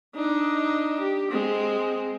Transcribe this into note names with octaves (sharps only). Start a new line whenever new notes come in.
D4 D#4
G4
G#3 C4